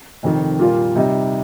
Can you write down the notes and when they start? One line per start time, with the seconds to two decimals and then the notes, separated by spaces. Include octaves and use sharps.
0.23 F1 F2 D#3
0.59 A#2 G3 A#3 F4
0.96 C3 G3 D#4